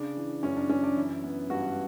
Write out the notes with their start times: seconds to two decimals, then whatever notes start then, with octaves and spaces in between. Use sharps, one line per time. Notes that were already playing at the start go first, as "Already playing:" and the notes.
Already playing: C#3 D4
0.17 E3
0.43 F#2 C#4
0.56 D4
0.69 F#2 C#4
0.83 D4
0.96 E3 E4
1.24 B3
1.50 G2 F#4